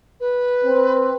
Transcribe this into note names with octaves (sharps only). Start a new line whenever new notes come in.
B4
C4